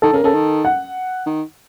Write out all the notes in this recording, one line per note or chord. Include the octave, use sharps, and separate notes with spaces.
D#3 A4
C#3 A#4
C#3 A4
D#3
F#5
D#3